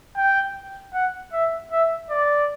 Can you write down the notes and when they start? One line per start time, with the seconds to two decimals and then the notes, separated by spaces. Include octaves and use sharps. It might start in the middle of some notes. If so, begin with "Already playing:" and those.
0.17 G5
0.94 F#5
1.33 E5
1.72 E5
2.11 D5